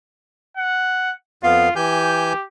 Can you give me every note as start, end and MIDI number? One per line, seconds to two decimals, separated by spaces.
0.57 1.13 78
1.43 1.69 41
1.43 1.69 59
1.43 1.71 65
1.43 1.69 77
1.76 2.33 52
1.76 2.44 67
1.76 2.33 80
1.76 2.33 91